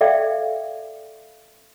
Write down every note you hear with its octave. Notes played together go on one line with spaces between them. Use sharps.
A4 D5 E5 F5 G5